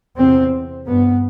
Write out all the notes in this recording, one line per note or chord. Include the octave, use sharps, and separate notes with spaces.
E2 C3 C4
G2 B3